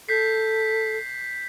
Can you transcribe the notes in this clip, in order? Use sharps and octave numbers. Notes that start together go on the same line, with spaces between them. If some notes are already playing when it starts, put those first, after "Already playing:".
A4 G6 B6 C7